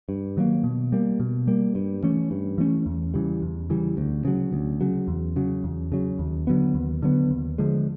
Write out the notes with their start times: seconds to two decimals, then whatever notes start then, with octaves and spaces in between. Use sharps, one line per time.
0.09 G2
0.37 D#3 F#3 A#3
0.64 B2
0.92 G3 A#3
1.20 B2
1.47 G3 A#3
1.75 G2
2.03 E3 A3 C#4
2.31 G2
2.58 E3 A3 C#4
2.86 E2
3.14 C#3 E3 G3
3.42 E2
3.70 C#3 E3 G3
3.97 D2
4.25 C#3 F#3
4.53 D2
4.81 C#3 F#3
5.08 E2
5.36 C#3 F#3
5.64 E2
5.92 C#3 F#3
6.19 D#2
6.47 D3 F#3 B3
6.75 D#2
7.02 D3 F#3 B3
7.30 D#2
7.58 D3 F3 G#3